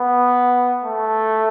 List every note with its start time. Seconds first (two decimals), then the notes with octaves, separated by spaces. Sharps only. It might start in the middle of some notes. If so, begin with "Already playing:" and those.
Already playing: B3
0.84 A3